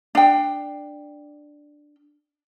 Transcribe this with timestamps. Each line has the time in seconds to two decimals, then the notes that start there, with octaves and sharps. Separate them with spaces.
0.15 D4 G5